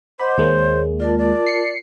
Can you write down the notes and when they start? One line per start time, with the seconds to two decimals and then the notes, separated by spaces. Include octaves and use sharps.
0.20 C5 D#5 F#5 B5 D6
0.38 D#2 G#3 A#3 C#5
1.00 F4 A#4 D5 A5
1.18 D5
1.47 C7 C#7